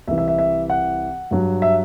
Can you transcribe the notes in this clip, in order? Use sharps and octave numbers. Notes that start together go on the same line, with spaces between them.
C2 C3 E3 E5
E5
E5
E5
F#5
G2 F#3
E5